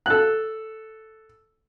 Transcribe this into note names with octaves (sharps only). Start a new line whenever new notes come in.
A4 F#6